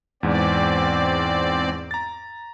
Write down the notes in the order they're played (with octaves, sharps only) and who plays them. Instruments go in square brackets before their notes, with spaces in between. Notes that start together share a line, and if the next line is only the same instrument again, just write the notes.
[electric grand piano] E2 G#2 [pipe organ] C4 D5
[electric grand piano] A#5 A6